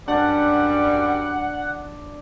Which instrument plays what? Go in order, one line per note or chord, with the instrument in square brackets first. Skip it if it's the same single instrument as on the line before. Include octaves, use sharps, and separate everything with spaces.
[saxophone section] F#2 G3 [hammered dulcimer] D4 [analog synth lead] F#5